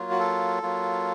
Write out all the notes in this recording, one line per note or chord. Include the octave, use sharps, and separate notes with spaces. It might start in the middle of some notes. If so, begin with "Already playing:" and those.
Already playing: F#3 A#3 F4
F#4
A4
F#3 A#3 F4